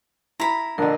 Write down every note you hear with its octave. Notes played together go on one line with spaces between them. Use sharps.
E4 A#5 B5
A#1 D3 D4 A#4 D#5